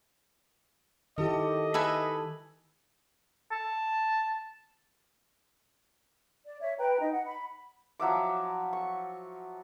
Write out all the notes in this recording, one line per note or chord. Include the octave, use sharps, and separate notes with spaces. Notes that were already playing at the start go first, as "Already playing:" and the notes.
D#3 E4 G4 A4 D#5
A4 B4 E5 G#5
A5
D5
C#5 E5
B4 G5 A#5
D#4 D#5
F#5
B5
F3 F#3 E5 D6
C#6